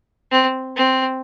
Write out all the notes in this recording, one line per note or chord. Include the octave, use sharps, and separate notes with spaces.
C4
C4